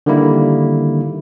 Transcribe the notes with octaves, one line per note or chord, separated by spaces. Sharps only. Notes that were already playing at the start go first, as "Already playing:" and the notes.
D3 D#3 G3 A#3 E4